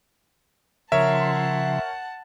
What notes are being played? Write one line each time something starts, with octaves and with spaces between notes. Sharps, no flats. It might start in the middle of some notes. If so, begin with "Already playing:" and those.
C#3 F3 A#4 C#5 E5 F#5 A5 C6